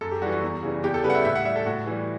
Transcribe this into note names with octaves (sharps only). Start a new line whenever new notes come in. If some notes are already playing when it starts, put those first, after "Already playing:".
F#2 A4
G4
E3 G3 F#4
F#4
E2
C#3 E3 G3
E2 G4
A4
C#3 G3 B4
F#5
E5
A2 E5
F#5
G3 E5
A4
A2 F#4
E3 G3